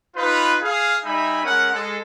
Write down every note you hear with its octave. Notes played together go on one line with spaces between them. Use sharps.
D#4 F4 B4
G#4 F5
G3 D#4 E5 G#5 B5
G#3 C#4 A#4 F#5
G#3 A4